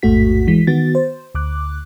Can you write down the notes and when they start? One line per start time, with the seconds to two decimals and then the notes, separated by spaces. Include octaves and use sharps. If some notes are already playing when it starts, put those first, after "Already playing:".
0.03 A1 E2 G#2 A3 F#4 B6
0.47 E3 G#3 B6
0.67 D#3 B3 F#4 A6
0.95 C5
1.35 D2 D6 F#6